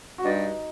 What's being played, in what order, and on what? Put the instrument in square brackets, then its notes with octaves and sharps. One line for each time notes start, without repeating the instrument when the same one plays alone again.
[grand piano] F#4
[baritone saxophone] G2 [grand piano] D#4